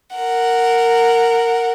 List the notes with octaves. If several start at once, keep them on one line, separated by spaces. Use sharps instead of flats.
A#4 F#5